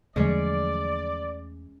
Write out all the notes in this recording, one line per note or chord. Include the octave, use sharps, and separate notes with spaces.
E2 D3 F3 F#3 G#3 A3 C#4 D5